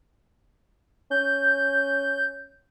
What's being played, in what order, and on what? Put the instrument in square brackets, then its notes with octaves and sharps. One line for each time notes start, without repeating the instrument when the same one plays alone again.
[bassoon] C#4 [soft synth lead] G6